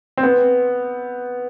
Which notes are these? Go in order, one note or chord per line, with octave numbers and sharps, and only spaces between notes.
C4
B3